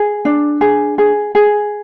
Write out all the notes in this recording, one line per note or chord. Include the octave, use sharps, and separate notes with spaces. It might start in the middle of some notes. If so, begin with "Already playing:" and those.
Already playing: G#4
D4
G#4
G#4
G#4